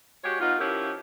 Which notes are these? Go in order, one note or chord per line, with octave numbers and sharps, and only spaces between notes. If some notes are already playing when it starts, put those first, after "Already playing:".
G#3 F#4 G4 C#5
B3 D#4 F4
F3 C#4 E4 G4 A#4